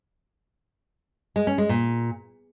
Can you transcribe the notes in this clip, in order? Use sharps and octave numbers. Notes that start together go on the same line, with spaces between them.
G#3
C#4
G#3
A#2